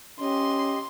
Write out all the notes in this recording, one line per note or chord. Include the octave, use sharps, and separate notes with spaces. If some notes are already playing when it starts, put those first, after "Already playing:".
C#4 G4 D#5 C6